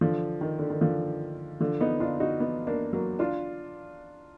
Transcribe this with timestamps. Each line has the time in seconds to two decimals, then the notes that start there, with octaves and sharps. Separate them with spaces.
0.01 D3 F3
0.41 D#3
0.59 D3
0.70 D#3
0.81 D3 F3
1.60 D3 F3
1.81 B3 D#4
2.00 D4 F4
2.20 D#4 F#4
2.40 B3 D#4
2.67 A#3 D4
2.93 F#3 A#3
3.19 D4 F4